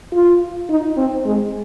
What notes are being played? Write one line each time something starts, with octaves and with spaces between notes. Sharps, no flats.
F4
D#4
C4
G#3